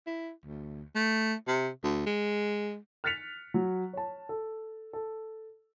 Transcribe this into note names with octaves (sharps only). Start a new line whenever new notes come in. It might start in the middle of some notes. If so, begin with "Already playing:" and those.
E4
D2
A3
C3
D2
G#3
F6 F#6 A6 B6 C#7 F7
F#3
C#5 A5
A4
A4